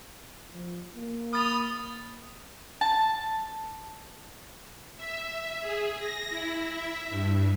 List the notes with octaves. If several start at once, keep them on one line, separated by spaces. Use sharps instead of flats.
F3
A#3
B5 D#6 F6 A6 F7
A5
E5
G#4
A#6
E4
E5
G2